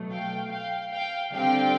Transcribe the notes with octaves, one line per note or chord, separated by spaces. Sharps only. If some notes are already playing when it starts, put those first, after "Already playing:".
Already playing: B2 F#3 A3
F5 G5
F5 G5
F5 G5
D3 G3 C4 F5 G5